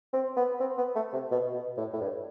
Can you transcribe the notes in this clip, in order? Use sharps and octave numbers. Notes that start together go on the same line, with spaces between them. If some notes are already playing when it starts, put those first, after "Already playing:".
C4
B3
C4
B3
A3
C3
B2
B2
A2
A2
G2